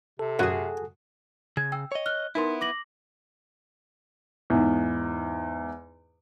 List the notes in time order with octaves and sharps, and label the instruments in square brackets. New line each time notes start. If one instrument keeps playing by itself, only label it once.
[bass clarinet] C3 [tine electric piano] A4
[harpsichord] F#2 [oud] F#4 G#4
[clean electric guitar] C#3 [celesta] G#6
[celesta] G5 E6
[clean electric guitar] C#5 D#5
[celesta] F6 F#6 G7
[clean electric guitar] B3 E4 [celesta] D#4 A#4 C6
[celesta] D6 A#6 F#7
[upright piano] E2 G#2